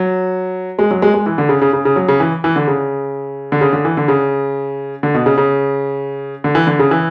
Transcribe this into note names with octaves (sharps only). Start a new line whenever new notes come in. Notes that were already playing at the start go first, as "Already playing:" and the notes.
Already playing: F#3
G#3
F#3
G#3
G#3
E3
D3
C#3
C#3
C#3
C#3
F#3
C#3
E3
E3
D3
C#3
D3
C#3
D3
E3
D3
C#3
D3
B2
C#3
C#3
D3
E3
D3
C#3
E3